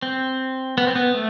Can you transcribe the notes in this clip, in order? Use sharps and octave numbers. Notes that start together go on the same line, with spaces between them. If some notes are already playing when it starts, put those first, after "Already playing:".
C4
B3
C4
B3
A3